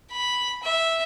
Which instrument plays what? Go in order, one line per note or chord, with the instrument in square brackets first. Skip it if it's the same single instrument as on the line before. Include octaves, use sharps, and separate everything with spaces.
[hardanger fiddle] B5
E5